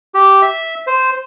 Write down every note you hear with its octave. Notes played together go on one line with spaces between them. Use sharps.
G4
E5
C5